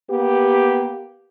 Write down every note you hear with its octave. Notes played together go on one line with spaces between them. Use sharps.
A#3 B3 G4